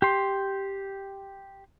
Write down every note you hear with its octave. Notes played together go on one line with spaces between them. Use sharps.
G4 C6